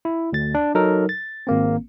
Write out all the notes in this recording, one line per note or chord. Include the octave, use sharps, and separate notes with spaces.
E4
D2 A6
D4
F#3 D#4 A4 A#4
A6
G#1 A#3 C4